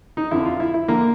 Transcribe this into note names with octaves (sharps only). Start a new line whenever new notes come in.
D#4
F2 D3 E4
F4
E4
E4
D3 A#3